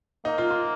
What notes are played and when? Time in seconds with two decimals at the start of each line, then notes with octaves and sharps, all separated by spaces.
0.25 A#3 D#4
0.38 F4
0.51 F4